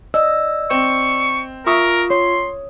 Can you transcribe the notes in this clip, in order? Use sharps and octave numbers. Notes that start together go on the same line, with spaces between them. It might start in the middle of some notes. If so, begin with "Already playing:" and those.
D5 D#5 E6
C4 C#6
F4 A#4 E5 C#6 D#6
C#5 C6